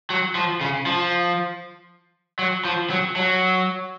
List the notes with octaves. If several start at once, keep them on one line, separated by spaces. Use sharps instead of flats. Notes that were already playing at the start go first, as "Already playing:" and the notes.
F#3
F3
C#3
F3
F#3
F3
F#3
F#3